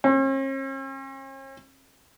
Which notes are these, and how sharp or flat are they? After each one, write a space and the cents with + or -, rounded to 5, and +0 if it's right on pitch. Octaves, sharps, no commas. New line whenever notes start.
C#4 -45